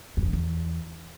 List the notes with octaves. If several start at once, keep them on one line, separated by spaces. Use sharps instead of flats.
F#2
F2
D3
E2